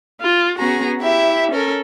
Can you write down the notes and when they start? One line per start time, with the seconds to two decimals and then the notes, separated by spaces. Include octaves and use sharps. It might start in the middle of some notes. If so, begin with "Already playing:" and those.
0.20 F4
0.57 B3 C#4 F#4 G#4 A#5
1.00 E4 G4 E5
1.51 C#4 A4 A#4